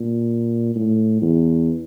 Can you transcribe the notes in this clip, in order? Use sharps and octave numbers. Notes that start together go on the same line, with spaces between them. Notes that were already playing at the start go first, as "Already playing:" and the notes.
Already playing: A#2
A2
E2